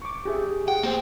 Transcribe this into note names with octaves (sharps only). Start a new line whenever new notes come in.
C#6 D6
G4 G#4 E5
G#4 F#5 G5
A#3 C5